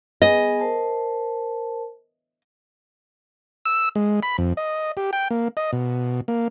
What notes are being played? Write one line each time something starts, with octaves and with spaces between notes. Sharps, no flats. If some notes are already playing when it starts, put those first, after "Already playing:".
B3 G#4 D#5 G#5
A#4 C5 A5
E6
G#3
B5
F2
D#5
G4
G5
A#3
D#5
B2
A#3